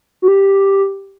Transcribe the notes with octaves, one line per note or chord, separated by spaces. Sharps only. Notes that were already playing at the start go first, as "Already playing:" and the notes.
F#4
G4